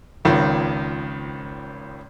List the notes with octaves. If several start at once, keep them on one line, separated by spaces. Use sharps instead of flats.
G#1 C#2 D#3 F3